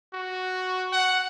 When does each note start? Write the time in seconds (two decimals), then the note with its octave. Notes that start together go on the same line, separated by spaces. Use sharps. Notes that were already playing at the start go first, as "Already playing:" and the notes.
0.14 F#4
0.92 F#5